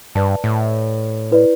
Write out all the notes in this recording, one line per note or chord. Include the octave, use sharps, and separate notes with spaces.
G2 B4 D5 A5
A2
E4 B4 D5